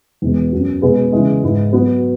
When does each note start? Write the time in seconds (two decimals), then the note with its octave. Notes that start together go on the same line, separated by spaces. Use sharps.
0.22 E2 B2 G#3 B3
0.53 F#2 F#3 B3 F#4
0.82 B2 G#3 B3 G#4 B4
1.13 C#3 E3 G#3
1.43 G#2 G#3 E4 B4
1.73 F#3 B3 F#4 B4